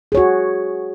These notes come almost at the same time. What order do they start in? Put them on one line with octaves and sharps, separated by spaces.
G#4 C#5 F#4